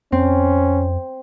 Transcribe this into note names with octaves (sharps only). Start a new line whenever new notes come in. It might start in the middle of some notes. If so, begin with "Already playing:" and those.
F2 C4 C#4